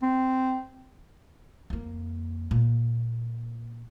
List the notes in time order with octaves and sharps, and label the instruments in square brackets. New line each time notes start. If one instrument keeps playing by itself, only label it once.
[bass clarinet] C4
[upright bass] F2 A#3
A#2